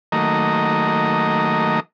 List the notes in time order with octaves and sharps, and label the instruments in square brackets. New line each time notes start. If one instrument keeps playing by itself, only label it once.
[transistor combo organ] D#3 F#3 A3 A#3 D#5 A#5